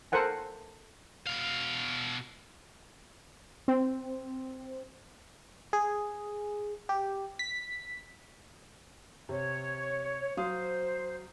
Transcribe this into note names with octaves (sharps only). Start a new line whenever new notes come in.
A4 A#4 C5 F#5 G#5
B2 F5
C4
G#4
G4
B6
C3 C#5
F#3 C5 F5 D#6